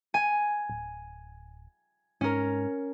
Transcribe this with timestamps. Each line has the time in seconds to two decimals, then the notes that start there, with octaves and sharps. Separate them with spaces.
0.14 G#5
0.70 D1
2.21 G#2 C#4 A#4